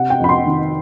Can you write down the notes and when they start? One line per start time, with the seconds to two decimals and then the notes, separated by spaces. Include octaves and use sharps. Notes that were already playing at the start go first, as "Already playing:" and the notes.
Already playing: C3 F#5
0.10 G5
0.20 F2 B5
0.29 C6
0.47 D#3